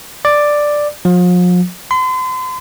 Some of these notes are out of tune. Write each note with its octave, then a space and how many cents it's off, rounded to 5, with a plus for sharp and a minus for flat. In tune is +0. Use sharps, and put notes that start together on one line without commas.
D5 +5
F3 +40
C6 -40